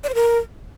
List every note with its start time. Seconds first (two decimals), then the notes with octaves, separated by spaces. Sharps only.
0.04 D5
0.09 C5
0.15 A#4